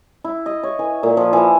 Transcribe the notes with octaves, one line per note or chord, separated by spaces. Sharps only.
E4
D#5
C#5
E3
A#2
F3
E3